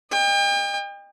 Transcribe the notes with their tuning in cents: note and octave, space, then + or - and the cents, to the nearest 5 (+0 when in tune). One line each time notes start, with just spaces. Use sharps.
D#5 -25 G5 +40